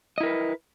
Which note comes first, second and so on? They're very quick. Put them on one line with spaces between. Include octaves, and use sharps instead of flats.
D#5 E4 A#4 B4